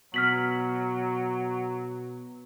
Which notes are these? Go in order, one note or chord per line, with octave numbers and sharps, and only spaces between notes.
B2 F#3 F6 B6 F#7